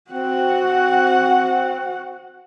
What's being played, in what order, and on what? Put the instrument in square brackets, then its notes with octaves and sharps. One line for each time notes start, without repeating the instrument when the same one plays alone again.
[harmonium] C4 [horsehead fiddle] F#4 F#5